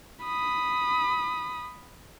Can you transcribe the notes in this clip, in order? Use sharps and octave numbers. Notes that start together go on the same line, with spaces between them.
B5 D#6